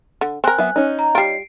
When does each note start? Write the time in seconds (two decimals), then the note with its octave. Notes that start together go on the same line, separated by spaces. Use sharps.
0.21 D3
0.44 C4 A#4 G#5 F#6
0.58 F#3 B3 E5
0.76 C#4 D#4
0.99 A#5
1.15 G3 F4 C7 D7